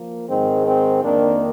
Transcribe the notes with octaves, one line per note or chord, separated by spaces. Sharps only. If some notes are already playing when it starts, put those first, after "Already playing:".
Already playing: F3 A#3
G#2 D#3 G#3 C4
C4
F2 D#3 A#3 D4